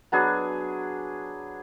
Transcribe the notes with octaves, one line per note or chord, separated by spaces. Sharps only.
F#3 B3 D4 G#4